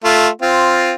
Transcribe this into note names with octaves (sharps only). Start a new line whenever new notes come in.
A3 F4
C4 F4